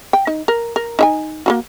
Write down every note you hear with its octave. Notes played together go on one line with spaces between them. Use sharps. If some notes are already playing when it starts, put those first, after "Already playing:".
G5
D#4
A#4
A#4
D#4 E5 G#5
A#3 F4 F#4